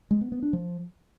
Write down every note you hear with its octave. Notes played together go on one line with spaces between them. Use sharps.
G#3
B3
B3
D4
F3